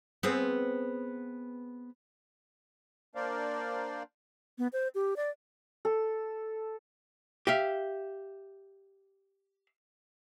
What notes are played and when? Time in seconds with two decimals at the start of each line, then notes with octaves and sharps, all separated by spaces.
0.23 B3 C4 G#4
3.15 A#3 D4 A#4 C5 D5 F5
4.58 B3
4.73 C5
4.95 G4
5.16 D5
5.85 A4
7.47 G4 E5 F5